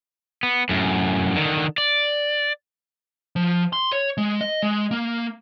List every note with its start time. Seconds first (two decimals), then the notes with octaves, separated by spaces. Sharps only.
0.43 B3
0.69 F#2 A2
1.35 D3 D#3
1.78 D5
3.36 F3
3.73 C6
3.92 C#5
4.17 G#3
4.41 D#5
4.63 G#3
4.91 A#3